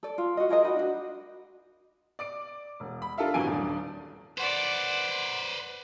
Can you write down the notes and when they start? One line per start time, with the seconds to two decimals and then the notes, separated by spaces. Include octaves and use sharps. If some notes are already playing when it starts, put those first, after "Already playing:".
0.03 A4 D5
0.18 F4
0.37 F#4 D#5
0.49 F4 G#4 A#4 D#5
0.64 D#4 F#4 D#5 B5
0.76 D4 F#4
2.19 D5 D6 D7
2.80 E1
3.02 B5
3.18 D4 F4 A4 A#4 E5 F5
3.34 G#1 G2 E3 F#3 G#5 D7
3.47 D#1 D4
4.38 B4 C5 D5 F#5